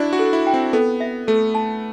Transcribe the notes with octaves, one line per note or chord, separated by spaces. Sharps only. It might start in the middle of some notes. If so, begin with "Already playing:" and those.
Already playing: D4 E4 F#4 D5
F#4
A4
E4
G5
C4
B3 A4
E5
A3 A4
A5